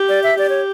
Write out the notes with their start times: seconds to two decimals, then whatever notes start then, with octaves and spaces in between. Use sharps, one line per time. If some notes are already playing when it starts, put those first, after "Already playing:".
Already playing: G4
0.09 D5
0.23 E5
0.38 G4 D5
0.49 C#5